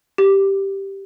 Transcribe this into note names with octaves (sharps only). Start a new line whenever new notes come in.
G4